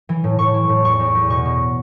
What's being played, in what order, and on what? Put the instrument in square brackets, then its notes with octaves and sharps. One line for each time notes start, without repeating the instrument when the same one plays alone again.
[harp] E3
A2
A2 C#6
E3
A2
E2 C#6
E2
E2
B2 C#6
B2